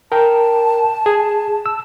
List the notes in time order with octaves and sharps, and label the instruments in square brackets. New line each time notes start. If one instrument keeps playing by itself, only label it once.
[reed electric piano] A#4 G5 [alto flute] A5
[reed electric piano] G#4
E6